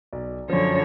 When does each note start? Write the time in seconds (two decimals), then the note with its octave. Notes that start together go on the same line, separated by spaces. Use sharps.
0.13 B1 D5
0.50 F#2 D3 F3 C#5